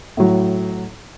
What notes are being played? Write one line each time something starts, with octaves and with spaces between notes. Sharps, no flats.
A2 F#3